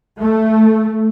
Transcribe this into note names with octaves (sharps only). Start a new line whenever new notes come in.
A3